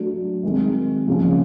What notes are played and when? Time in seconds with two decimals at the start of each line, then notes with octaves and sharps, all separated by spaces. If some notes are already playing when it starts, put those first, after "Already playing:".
Already playing: F#3 A3 D4 F#4
0.43 D#3 G#3 C4
1.08 C#3 F3 A#3 C#4